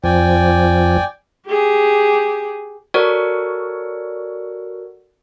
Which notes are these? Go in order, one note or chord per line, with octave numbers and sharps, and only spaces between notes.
F2 F3 D5 G5 G#5
G4 G#4
F#4 A4 A#4 C#5 D5 F#5